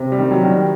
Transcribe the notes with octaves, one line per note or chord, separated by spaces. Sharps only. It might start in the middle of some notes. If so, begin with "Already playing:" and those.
Already playing: C3
G3
D#3
F#3
D#3
G3